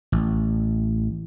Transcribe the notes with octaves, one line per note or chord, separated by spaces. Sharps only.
A1